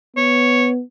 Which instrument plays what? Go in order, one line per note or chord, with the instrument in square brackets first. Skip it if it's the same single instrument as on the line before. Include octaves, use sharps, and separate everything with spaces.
[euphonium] B3 [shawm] C#5